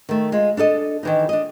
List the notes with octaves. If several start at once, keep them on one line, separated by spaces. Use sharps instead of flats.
D#3 A3
G#3 F4
D4 E4 A4 D#5
D#3 E3 D#4
D4 D#5